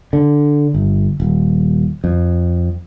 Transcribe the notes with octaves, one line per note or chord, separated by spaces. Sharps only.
D3
G1
D#1
F2